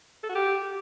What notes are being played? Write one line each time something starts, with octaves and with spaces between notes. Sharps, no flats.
A4
F#4
G4